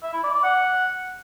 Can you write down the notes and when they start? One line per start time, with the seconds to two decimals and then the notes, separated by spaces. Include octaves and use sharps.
0.03 E5
0.13 E4
0.23 D5
0.34 D5
0.44 F#5